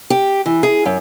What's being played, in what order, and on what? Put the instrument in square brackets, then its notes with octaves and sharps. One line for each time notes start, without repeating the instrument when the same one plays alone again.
[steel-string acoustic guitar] G4
E3
G#4
F#2